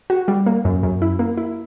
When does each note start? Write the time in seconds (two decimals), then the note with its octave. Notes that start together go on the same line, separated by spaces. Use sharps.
0.10 F#4
0.28 G3
0.46 A#3
0.65 F#2
0.83 F#2
1.02 E4
1.19 A#3
1.37 E4